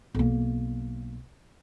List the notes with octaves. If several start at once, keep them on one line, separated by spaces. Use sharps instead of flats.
B1 A#3